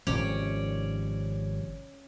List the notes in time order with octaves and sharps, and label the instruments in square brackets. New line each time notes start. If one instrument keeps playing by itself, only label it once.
[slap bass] G#1 C3 F3 [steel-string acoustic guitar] C#4 C#5 D5